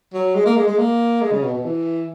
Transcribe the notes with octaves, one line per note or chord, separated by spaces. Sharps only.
F#3
G#3
A#3
G#3
G#3
A#3
G#3
C#3
B2
B2
E3